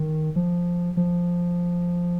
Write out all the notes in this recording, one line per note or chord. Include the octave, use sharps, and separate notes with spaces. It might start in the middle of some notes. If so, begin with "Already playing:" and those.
Already playing: D#3
F3
F3